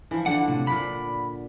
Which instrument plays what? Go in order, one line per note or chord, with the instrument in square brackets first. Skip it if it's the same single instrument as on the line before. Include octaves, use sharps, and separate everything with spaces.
[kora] E3 F3
[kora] D3 D4 [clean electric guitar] F#5
[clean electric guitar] A2 C3
[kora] A#2 D5 F#5 [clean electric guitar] B5